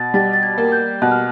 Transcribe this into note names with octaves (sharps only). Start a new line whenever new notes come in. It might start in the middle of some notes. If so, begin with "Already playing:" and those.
Already playing: B2 A6
G3 A6
A6
G#6
A#3
G6
B2 F#6
F6